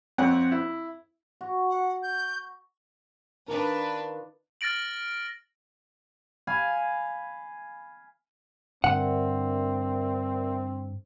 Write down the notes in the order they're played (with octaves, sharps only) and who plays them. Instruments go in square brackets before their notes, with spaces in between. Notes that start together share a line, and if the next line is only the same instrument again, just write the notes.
[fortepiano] F2 C4 C#5 F#5
E4
[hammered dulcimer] F#4
[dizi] F#5
G6
[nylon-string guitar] D#3 F4 A#4 [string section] D4 B4
[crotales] F6 A6 A#6 D7 F#7
[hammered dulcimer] F5 G#5 B5
[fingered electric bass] G2 D3 [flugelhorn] C4 [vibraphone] A#4 D5 E5 [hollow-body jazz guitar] F#5